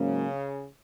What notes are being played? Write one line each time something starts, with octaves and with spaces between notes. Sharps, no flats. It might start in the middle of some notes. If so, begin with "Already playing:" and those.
Already playing: G#2 C#3 F#3 A#3 C#4